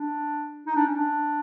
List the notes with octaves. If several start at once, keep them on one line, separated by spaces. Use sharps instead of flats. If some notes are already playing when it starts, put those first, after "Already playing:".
Already playing: D4
D#4
D4
C#4
D4